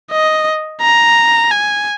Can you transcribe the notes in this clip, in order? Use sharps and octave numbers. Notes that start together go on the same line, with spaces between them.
D#5
A#5
G#5